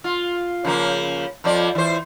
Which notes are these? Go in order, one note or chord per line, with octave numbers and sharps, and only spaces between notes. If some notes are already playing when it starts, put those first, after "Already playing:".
F4
C#3 F3 A#3
F2 F3 D5
E3 C5